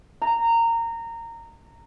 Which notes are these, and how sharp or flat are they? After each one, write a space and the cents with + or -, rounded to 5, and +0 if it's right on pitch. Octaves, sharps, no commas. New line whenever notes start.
A#5 -20